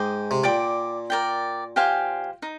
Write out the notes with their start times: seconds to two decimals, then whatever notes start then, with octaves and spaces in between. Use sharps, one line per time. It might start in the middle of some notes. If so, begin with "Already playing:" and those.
Already playing: G#2 G#4 D#5 G5 D6
0.31 C3
0.44 A#2 D5 G5 D6
1.10 A#4 D5 G5
1.76 G4 C5 F5 G#5
2.42 D#4